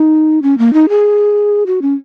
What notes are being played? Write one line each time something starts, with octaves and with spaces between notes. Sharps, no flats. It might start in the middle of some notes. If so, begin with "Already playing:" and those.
Already playing: D#4
C#4
A#3
D#4
G#4
F#4
C#4